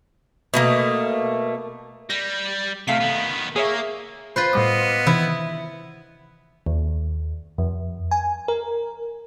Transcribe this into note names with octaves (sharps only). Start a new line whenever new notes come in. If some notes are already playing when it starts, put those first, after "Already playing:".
B2 A3 A#3
G3 A#6
C3 A3 F5 B6
D#3 B3
A#3 G#4 C#5 E5
F4 B4 C5
A2 G3 B3 D#5 D6
C3 D#3 E3 E4
D#2
F2
G#5
A#4